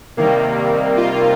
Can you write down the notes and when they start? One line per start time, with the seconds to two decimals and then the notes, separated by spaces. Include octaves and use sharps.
0.17 C3 D#3 G3 A#3
0.97 F4